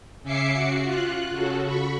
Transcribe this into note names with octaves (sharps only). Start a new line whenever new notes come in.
C#3 C#4 E5 D6 C7 C#7
F#4
F4 F#6
C#3 F#4 A4
B5 C#6